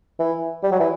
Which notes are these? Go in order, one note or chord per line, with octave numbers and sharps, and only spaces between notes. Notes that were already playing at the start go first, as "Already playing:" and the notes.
E3
G3
F#3
E3